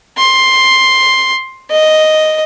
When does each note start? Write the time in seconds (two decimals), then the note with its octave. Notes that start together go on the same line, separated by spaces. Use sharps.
0.18 C6
1.70 D#5